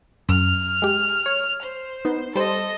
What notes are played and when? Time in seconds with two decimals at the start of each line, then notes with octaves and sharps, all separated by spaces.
0.29 F#2 F6
0.82 G#3 G4
1.26 C#5
1.62 C5
2.05 B3 D#4
2.36 G3 A4 C5 D#5